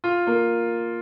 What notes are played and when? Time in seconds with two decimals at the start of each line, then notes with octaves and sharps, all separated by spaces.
0.04 F4
0.27 A#3